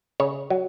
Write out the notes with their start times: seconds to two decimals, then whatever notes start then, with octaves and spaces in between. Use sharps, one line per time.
0.20 C#3 C#5
0.50 F#3